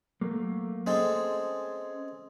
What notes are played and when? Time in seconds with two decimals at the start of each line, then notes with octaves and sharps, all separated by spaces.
0.21 F#3 A3 A#3
0.87 G#3 C4 C#4 G#4 A4